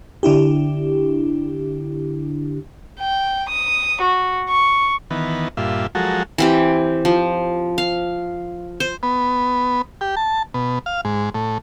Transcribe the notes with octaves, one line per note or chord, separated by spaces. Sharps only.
D3 D4 E4 G4
G5
D#6
F#4
C#6
D#3 E3 B3
G2 A#2 F4 E5
F3 F#3 G#3 F#4 A4 A#4
E3 C4 G4
F3
F5
C5
B3
G4
A5
B2
F5
G#2
A2